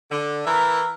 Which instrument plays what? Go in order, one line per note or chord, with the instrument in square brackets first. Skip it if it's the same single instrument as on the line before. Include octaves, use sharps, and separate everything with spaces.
[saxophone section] D3
[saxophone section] E3 A#4 E5 [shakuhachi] A#5